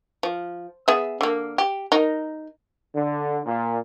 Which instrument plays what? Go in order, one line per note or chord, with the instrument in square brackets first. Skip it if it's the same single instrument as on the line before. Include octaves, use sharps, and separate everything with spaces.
[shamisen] F3
B3 G#4 E5
D3 A#3
G4
D#4 A#4
[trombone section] D3
A#2